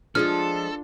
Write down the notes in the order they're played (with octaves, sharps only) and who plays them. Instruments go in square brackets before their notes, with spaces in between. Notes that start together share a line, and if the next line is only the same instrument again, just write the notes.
[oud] F3 G#3 [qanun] D4 F4 [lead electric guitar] A4 [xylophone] F6